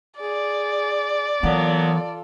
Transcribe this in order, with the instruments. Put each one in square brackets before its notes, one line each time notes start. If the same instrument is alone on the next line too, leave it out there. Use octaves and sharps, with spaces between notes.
[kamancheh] G#4 [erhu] D5
[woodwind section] A#2 F#3 B3 [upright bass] E3 [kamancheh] F4 A4